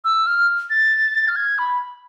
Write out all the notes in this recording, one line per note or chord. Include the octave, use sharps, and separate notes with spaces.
E6
F6
A6
F6
G#6
B5